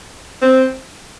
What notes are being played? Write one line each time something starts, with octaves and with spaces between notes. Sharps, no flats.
C4